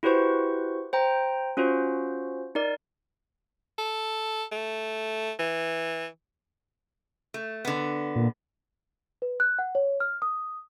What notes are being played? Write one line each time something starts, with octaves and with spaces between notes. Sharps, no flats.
E4 F#4 G4 B4 C5 C#6
C5 G5 A#5
C#4 F4 F#4 C5
D#4 A#4 D5
A4
A3
E3
A3
D3 B3
A#2
B4
F#6
F#5
C#5
F6
D#6